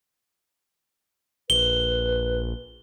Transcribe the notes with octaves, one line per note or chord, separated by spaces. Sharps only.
A#1 B4 G7